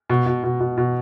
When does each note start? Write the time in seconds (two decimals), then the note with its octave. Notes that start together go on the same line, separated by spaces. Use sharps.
0.10 B2
0.26 B2
0.43 B2
0.60 B2
0.77 B2